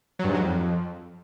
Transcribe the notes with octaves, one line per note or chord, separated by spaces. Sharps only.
F#3
G2
G#2
F#3
F2